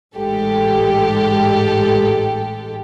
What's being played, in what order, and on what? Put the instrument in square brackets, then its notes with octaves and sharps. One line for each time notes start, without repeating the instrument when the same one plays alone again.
[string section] A1 G#2 G#3 G4 A4